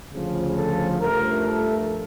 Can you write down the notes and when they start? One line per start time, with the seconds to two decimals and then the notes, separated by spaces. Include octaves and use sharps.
0.12 D2 C#3 F3
0.56 A4
1.00 G2 F3 A3 A#4
1.45 A4